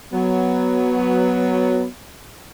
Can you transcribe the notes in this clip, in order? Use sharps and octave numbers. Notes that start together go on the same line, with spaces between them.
F#3 B3